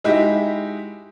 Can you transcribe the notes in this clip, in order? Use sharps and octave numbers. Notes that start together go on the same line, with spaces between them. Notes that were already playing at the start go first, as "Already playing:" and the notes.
G#3 D#4 E4 F#4 G4